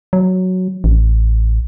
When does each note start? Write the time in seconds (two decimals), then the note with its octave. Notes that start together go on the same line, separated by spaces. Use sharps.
0.13 F#3
0.84 A1